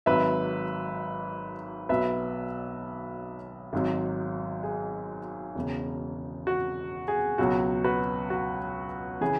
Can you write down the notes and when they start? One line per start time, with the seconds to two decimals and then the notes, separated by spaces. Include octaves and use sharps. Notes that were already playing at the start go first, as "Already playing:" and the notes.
0.06 G#1 G#2 F#3 B4 E5
1.89 B1 B2 F#3 B4 E5
3.73 G#1 G#2 F#3
4.63 G#4
5.55 E1 E2 C#3
6.47 F#4
7.08 G#4
7.38 C#2 B2 F#3 F#4
7.84 F#4 B4
8.30 F#4
9.21 C#3 E3 G#4